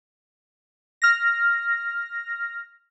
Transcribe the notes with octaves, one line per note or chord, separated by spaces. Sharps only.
F6 A#6